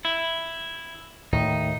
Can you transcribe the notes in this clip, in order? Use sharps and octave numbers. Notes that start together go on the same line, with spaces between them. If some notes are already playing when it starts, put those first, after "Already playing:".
E4
D#2 A2 D#3 D#4